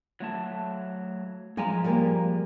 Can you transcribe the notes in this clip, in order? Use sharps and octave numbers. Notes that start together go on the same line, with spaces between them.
F#3 A3 A5
G2 F3 G#3 F5 G#5 A#5
G3 G#3 A#3